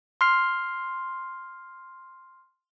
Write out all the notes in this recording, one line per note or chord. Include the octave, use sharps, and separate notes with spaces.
C6 F6 C7